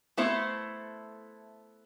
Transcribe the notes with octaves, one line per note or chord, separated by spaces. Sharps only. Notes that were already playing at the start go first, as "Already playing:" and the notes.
A3 B3 E4 A4 C5